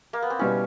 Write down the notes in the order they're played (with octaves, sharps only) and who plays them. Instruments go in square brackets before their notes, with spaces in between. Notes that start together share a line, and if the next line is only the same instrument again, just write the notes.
[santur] A#3
B3
C4
[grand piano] B2 G3 B3 E4 [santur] C#4